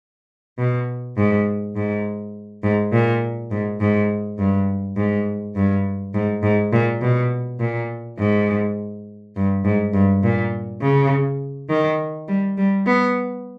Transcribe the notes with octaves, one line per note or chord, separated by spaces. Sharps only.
B2
G#2
G#2
G#2
A#2
G#2
G#2
G2
G#2
G2
G#2
G#2
A#2
B2
A#2
G#2
G2
G#2
G2
A#2
C#3
D#3
G3
G3
B3